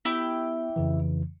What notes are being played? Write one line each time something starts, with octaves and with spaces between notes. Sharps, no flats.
B3 E4 G4
F2 C#3 E3